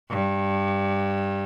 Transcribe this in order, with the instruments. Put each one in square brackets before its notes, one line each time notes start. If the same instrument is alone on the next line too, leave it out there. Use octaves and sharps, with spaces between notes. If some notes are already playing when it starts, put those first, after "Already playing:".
[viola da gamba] G2